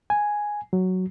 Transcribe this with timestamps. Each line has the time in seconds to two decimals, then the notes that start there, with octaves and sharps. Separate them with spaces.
0.10 G#5
0.73 F#3